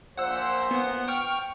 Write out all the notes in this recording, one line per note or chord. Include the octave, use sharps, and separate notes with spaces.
A#1 A#2 C5 F#5 E6
B3 F#5
G5 C#6 F6